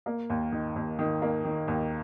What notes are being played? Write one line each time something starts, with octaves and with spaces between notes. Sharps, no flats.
A#3
D#2
D#3
D#2
D#3
A#3
D#3
D#2